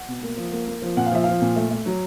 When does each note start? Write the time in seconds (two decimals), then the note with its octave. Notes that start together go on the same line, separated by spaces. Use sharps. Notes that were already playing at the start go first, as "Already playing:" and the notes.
Already playing: F#5
0.08 B2
0.23 A#3
0.37 F3
0.52 A#3
0.67 A#3
0.82 F3
0.97 A#2 F#5
1.06 F5
1.12 F3 E5
1.24 F3 F5
1.42 A#2
1.56 A3
1.71 A3
1.86 F#3